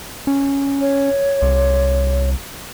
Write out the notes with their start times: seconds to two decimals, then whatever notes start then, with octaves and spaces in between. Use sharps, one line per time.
0.27 C#4
0.81 C#5
1.42 C2